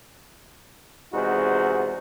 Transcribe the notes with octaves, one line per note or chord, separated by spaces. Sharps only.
E2 C3 G#3 D#4 F#4 C5